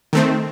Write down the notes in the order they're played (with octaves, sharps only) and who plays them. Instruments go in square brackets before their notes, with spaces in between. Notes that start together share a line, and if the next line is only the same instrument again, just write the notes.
[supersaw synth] D#3 A3 C4